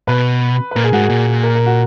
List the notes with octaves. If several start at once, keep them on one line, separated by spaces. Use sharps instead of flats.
B2 B4
B4
A#2 A#4
G#4
G#2 F#4
G#4
A#2
A#4
A#4
F#4